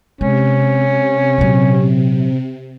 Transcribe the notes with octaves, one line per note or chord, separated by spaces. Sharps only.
C3 G#3 C#4
A#2 F#3